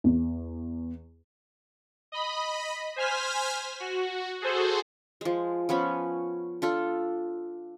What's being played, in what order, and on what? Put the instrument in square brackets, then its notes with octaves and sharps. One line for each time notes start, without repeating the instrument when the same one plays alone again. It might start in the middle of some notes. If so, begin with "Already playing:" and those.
[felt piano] E2
[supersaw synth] D#5 B5
C5 G#5 F6 B6
F#4
F#4 G#4 A4 C5
[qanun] F3 G#3
F3 B3 C#4 B5
D4 F4 A4